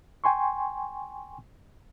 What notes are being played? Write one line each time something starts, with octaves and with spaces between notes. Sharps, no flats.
G5 G#5 C6 C#6